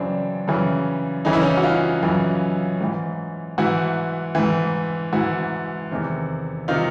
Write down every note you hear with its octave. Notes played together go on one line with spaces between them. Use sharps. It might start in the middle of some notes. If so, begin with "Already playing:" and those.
Already playing: F#2 C#3 E3 C4 D4
F#2 C#3 E3
F#2 C#3 E3 D#4
E4
C#4 D#4
F#4
D#4 F4
F#2 C#3 E3
G#2 E3
G#2 E3 E4 F#4
G#2 E3
G#2 E3 E4 F#4
E2 C3 D#3
C3 D#3 D#4 F4